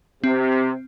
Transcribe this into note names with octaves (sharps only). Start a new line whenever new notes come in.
C3 C4